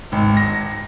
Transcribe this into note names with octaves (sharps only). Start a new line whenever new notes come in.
G#1
A#6